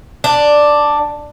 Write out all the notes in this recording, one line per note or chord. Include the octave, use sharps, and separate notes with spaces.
D4